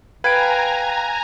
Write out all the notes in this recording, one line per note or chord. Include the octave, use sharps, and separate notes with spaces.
B4 F5 G5 G#5 A#5 G#6 D7